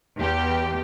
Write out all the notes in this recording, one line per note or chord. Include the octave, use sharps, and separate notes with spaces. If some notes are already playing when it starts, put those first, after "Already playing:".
E2 G4